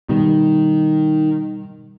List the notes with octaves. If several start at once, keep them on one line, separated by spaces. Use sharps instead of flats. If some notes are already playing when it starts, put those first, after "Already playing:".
B2 D#3 G3